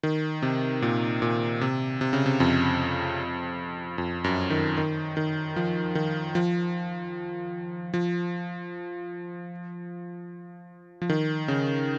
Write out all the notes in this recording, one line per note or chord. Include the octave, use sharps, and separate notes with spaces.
D#3
C3
A#2
A#2
C3
C3
C#3
C3
F2
F2
F#2
D#3
D#3
D#3
F3
D#3
F3
F3
F3
D#3
C#3